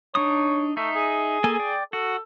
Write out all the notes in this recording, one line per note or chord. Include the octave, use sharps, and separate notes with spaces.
D4 D#4 C#5 D#6
A3 D#4 E5
G#4
A#3 A4 G#5
D5 G5
F#4 A4